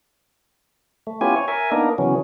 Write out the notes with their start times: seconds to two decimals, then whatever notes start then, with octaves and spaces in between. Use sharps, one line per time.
1.07 A3
1.21 B3 C#4 E4 F4 G4 G#5
1.36 C#5
1.48 A#4 E5 G#5
1.72 A#3 B3 D4 D#4 A#4
1.98 C#3 E3 F#3 B3 C#4